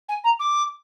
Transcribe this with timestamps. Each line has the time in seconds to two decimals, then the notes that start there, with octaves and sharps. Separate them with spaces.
0.08 G#5
0.24 A#5
0.39 D6